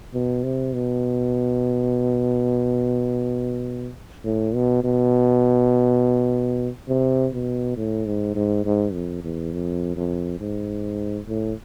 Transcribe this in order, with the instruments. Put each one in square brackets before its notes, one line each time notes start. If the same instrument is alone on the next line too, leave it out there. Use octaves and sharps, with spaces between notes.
[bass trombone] B2
C3
B2
A2
B2
B2
C3
B2
A2
G#2
G#2
G#2
F2
E2
F2
F2
G#2
A2